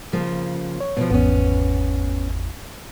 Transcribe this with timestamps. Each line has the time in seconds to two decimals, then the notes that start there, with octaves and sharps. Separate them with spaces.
0.13 C#3 F3 A#3
0.80 C#5
0.97 B2 F3
1.10 G#1 E2 B3 C#4